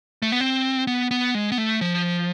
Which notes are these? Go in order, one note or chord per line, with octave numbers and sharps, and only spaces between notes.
A3
B3
C4
B3
B3
G#3
B3
A3
F3